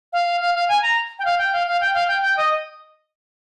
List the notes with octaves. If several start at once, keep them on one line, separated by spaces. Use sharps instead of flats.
F5
F5
F5
G#5
A#5
G5
F5
G5
F5
F5
G5
F5
G5
G5
D#5